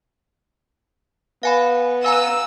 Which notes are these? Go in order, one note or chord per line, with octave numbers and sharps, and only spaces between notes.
B3 F5 G#5 B5
F5 G#5 A#5 E6